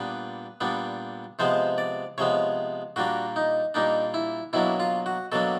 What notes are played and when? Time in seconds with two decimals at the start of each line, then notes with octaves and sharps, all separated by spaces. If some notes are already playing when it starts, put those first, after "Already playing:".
Already playing: A#2 G3 B3 D4 B4
0.61 A#2 G3 B3 D4
1.39 C3 F3 G#3 B3 C5
1.78 D5
2.18 C3 F3 G#3 B3 C#5
2.96 A#2 G3 A#3 D4 F#4
3.36 D#4
3.74 A#2 G3 A#3 D4 D#4
4.14 E4
4.53 B2 F#3 A#3 D4 E4
4.80 F4
5.06 F#4
5.32 B2 F#3 A#3 D4 A4